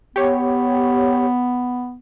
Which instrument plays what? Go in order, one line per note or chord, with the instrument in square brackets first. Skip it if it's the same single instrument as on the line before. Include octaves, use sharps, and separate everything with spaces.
[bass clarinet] B3 [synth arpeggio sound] G4 C#5